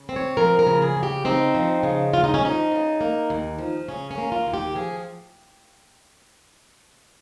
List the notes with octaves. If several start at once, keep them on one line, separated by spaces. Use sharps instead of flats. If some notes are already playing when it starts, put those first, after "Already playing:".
Already playing: C#3
C4
C#5
F3 A#4
A#4
C#3
G#4
C#3
G4
C4 D#4
F3
C#3
D#2 F4
D#4
C#4
F3 D#4
C#3
A#3
D#2
F3
C#3 C#4
C#4
A#3
F4
D#2
G4
F3 G#4